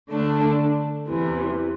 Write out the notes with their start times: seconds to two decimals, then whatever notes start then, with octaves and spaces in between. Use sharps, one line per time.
0.09 D3 A3 D4 A4
1.08 E2 C3 E3